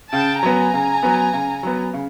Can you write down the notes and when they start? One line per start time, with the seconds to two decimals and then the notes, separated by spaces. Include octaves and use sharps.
0.13 C#3 G5 A5
0.42 F#3 B3 G#5 A#5
0.73 C#3
1.03 F#3 B3
1.33 C#3
1.63 F#3 B3
1.94 C#3